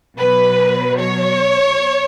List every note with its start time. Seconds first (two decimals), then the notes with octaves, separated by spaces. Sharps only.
0.19 B2 F#3 B4
0.99 C#5